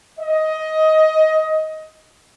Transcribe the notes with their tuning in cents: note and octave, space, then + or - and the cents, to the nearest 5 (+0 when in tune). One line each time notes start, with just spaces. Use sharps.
D#5 +15